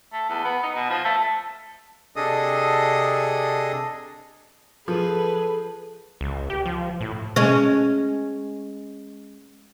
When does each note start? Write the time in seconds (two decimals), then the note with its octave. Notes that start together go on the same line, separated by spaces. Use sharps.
0.13 A3
0.29 E2
0.45 B3
0.63 D#4
0.75 B2
0.90 F3
1.05 A3
2.16 C3 D4 G#4 A4 D#5 D#6
4.88 F3 G#4 A4 B4
6.21 C#2
6.50 G4
6.66 F3
7.01 A2
7.36 G#3 C#4